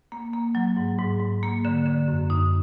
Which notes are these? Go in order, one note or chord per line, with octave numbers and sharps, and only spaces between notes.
A#3
A#3
F#3
G#2
G#2
G#2
A#3
D3
D3
F#2
D#4